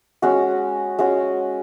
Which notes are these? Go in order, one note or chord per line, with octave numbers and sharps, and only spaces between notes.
G#3 C#4 F#4
G#3 C#4 F#4